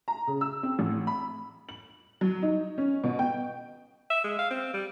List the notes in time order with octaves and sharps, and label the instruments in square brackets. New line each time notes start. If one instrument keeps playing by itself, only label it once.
[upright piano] A#5
C#3
E6
C4
A1
B5
[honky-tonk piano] F#7
F#3
D#4
C#4
B2
G5
[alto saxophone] E5
G#3
F5
C4
G3